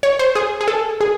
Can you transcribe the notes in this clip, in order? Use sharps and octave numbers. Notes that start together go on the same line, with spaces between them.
C#5
C5
G#4
G#4
A4
G#4